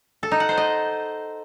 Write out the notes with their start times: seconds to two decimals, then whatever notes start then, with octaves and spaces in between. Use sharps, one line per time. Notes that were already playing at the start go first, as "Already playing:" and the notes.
0.23 A4
0.32 D#4
0.40 F#5
0.49 C5
0.57 D#5